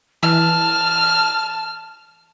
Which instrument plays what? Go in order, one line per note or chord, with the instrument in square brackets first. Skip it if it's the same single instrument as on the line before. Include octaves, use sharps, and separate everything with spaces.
[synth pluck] E3 [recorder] A5 [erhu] F6